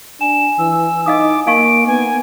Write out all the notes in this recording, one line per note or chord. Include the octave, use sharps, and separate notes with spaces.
D4 G#5 E7
E3 E6
D#4 D#5 F5 D6 D#6
A#3 D#4 F5 C#6 D7
B3 G#5